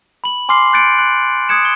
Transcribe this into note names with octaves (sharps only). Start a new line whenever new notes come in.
B5 F#7
G#5 C6 D6 F6 C7
F#6 G6 A6 C#7 D7
F#6 F#7
D#6 F#6 G#6 C#7 E7
D7 G7